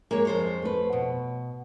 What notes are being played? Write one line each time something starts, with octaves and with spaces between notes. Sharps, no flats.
G#3 A#3 C#5
F2 C5 C#5
A3 B4
B2